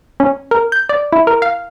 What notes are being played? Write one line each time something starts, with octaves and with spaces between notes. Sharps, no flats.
C#4
A#4
G6
D5
E4
A#4
F5